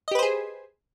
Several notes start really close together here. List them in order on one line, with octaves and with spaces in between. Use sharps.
D#5 G4 B4 C5 G#4